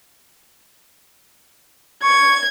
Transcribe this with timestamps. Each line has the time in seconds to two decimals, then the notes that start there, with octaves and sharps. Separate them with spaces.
2.03 C#6 G#6